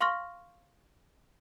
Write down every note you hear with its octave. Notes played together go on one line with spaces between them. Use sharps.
F5 C6 C#6 F6 A#6